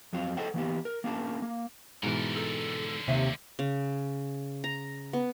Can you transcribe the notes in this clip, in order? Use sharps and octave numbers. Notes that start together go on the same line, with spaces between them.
F2 F#3 C4 F4
G#4 A4 C5 D#5 F#5 G5
E3 A#3 B3 G4
A#4
A#3 C#4 D4 G#4 A#4 A5
A#3
G#2 B2 D3 E3 A#4
A4
D#2 C3 E5
C#3
A#5
B3